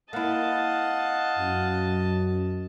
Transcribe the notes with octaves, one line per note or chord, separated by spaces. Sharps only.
A#3 E4 D#5 F5 F#5 A5
F#2